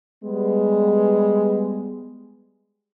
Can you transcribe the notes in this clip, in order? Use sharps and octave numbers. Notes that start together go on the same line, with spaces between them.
G3 G#3 B3